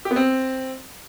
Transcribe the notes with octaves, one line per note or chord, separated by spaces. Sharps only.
G4
B3
C4